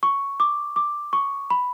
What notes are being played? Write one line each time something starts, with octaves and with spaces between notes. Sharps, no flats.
C#6
D6
D6
C#6
B5